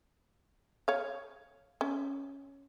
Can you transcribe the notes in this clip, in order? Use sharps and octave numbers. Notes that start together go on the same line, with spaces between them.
C#5 F5
C#4